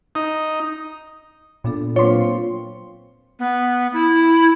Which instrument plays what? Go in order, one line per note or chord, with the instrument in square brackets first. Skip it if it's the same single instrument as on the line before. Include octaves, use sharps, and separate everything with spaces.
[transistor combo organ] D#4
[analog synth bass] A#2 [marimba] B3 D4 A4
[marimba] F#3 D4 B4 [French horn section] A#3 C4 F4 [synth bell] C#5 C6
[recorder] B3
E4